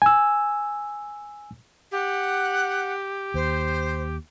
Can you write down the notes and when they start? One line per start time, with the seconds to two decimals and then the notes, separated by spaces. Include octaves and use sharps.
0.02 G#5 E6
1.92 G4 F#5
3.34 D#2 C5